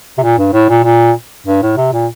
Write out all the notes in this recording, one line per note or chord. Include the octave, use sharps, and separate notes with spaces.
C3
A#2
G2
A2
A#2
A#2
G2
A2
C3
A#2